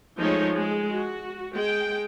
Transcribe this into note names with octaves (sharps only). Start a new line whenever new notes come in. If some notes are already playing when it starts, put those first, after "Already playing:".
F3 G#3 A3 D#4 C#5
G#3
F#4
G#3 G5